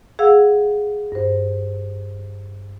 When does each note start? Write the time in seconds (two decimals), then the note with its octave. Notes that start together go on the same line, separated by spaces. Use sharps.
0.19 G#4 F5 F#5 E6
1.12 G2 C5